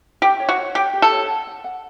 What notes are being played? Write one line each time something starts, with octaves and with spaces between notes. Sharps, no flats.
G4 G5
C#5
F#4
C#5
G4 G5
G4
A4
C#5
F#5
F#5
F#5